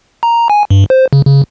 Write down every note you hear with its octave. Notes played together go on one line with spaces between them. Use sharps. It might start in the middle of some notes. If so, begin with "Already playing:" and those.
A#5
G#5
G2
C5
C#3
C#3